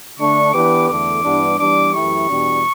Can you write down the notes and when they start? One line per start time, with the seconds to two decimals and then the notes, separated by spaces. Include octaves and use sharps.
0.18 D3 A3 D4 C#6
0.53 E3 B3 D4 G4 B4 D6
0.88 E2 D3 A3 D6
1.24 G2 E3 G3 B3 D4
1.59 E3 G3 B3 D4 D6
1.94 F#2 E3 A3 E4 G4 C#6
2.29 E2 B2 G3 D4 G4